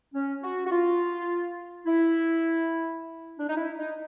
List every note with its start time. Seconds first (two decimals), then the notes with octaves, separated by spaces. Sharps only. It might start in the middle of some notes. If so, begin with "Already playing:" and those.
0.15 C#4
0.43 F#4
0.67 F#4
0.72 F4
1.87 E4
3.39 D4
3.49 D#4
3.57 E4
3.79 D#4